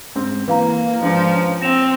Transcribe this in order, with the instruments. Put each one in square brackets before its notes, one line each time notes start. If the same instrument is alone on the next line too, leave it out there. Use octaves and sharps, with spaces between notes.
[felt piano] G#2 C4
[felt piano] E3 [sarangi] A#3 [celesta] B4 F5 A#5
[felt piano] G#2 D4 [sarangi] F3
[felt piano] C#4
[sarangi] C4 [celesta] A#6 E7 F7